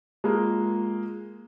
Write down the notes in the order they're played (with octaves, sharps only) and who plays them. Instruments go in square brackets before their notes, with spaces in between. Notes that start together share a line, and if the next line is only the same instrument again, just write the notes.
[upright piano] G#3 A#3 F4